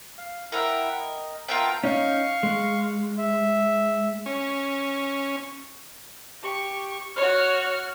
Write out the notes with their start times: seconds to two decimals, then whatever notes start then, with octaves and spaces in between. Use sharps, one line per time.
0.18 F5
0.52 E4 A#4 E5 F#5 G5
1.00 D#5
1.48 B3 F4 A#4 E5 G5 A5
1.84 C#4 D#4 F5 C#6
2.43 G#3
3.18 E5
4.26 C#4
6.43 G4 C#6
7.16 F#4 C#5 F6